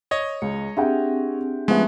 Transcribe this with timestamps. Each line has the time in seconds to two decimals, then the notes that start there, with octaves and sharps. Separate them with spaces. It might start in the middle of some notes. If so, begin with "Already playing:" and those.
0.11 C#5 D#5
0.42 C#2 C#7
0.77 C4 D4 G4 G#4 E5 F#5 G5
1.68 F3 G#3 A3 B3 C#4 E5